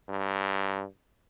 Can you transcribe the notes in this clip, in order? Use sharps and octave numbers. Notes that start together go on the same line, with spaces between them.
G2